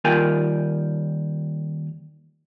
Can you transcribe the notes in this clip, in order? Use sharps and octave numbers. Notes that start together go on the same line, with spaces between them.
D#2 G3 F4 A#4 G5 G#5